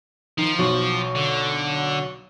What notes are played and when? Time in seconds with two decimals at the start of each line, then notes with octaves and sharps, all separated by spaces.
0.38 D#3 F3
0.59 B1 F#4
1.15 D3